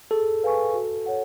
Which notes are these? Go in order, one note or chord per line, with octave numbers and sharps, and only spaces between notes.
G#4 A4
B4 F5 G#5 C#6
F#4
C#5 F#5